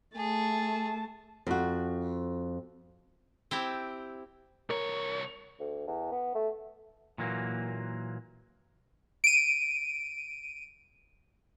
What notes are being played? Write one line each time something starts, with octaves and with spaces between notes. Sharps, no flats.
A3 G#4 A5
F2 F#4
C4 E4 G4
C2 A#4 C#5
D2
E2
B3
A3
A#2 E3 F#3 A#3
D7 D#7